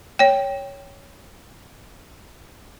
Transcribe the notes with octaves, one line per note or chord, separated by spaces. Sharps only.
C#5 G5